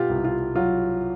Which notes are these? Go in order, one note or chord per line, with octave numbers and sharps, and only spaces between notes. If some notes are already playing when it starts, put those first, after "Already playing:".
Already playing: B2 F4 G4
C2
F4
F#3 F4